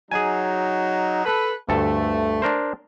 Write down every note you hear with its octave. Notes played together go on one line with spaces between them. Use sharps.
F#3 D#4 G#4 G#5
A4 B4
D2 G2 A3 A4
D4 A#4 C5